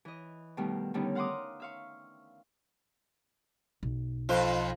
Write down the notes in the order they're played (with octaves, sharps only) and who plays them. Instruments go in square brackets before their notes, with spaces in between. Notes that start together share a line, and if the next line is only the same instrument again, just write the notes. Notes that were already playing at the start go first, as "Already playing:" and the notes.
[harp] E3 D#5
B2 D#3 G3 A3
D3 D#3 G3 B3 C#4 D#4
F5 F#5 A#5 C6 D6 D#6
E5 F5 C#6
[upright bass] B1
[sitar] F2 C5 [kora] F3